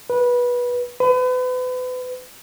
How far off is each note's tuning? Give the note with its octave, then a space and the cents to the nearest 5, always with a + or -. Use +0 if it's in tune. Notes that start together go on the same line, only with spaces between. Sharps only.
B4 -20
B4 +35